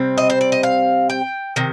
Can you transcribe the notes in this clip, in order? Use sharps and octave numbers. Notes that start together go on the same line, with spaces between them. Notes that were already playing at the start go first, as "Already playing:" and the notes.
Already playing: C3 G3 C4
D#5
C5
D5
D#5
F5
G5
C3 D#3